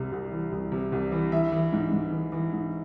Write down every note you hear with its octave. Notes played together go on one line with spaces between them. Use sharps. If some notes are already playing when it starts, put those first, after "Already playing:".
Already playing: C2 C3
C2
E3
C2
C3
C2
E3
E3 E5
E3
G#2
G#2
E3
E3
G#2